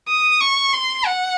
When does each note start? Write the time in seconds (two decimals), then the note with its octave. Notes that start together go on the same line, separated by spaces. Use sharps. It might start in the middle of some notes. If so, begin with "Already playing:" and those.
0.09 D#6
0.41 C#6
0.73 C6
1.06 F#5